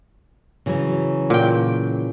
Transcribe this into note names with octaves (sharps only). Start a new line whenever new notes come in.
C#3 E3 F#3
A#2 G5